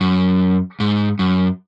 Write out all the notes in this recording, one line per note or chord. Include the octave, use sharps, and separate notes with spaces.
F#2
G#2
F#2